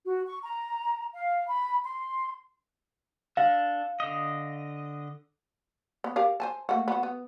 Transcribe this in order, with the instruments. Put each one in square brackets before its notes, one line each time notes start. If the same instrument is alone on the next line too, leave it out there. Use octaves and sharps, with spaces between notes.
[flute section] F#4
C#6
A#5
F5
B5
C6
[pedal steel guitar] D4 A4 [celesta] F5
[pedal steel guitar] D3 D#5
[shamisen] B3
G4 A#4 F5
C5 G#5 A5
A3 A#3 F#4
B3 F#4
B3